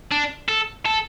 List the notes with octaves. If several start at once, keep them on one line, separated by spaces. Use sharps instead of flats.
D4
A4
A4